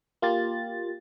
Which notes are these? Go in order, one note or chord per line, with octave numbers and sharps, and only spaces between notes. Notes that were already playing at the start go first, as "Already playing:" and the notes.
A#3 F4 G4 A6